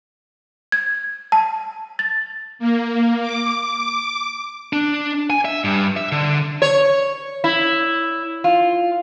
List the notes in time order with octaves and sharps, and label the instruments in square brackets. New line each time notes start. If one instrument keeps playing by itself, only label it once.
[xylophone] G#6
A5
A6
[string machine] A#3
D6
[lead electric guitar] D4
G#5
E5
G2
E5
D3
[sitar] C#5
E4
F4